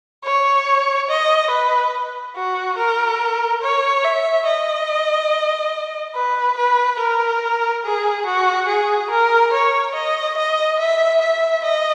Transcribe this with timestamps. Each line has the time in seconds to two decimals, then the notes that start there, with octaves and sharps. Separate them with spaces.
0.24 C#5
1.09 D#5
1.51 B4
2.36 F#4
2.78 A#4
3.63 C#5
4.04 E5
4.47 D#5
6.15 B4
6.58 B4
7.00 A#4
7.84 G#4
8.26 F#4
8.69 G#4
9.11 A#4
9.53 C#5
9.95 D#5
10.38 D#5
10.79 E5
11.22 E5
11.64 D#5